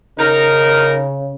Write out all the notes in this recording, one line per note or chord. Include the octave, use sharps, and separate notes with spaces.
C#3 D#4 A#4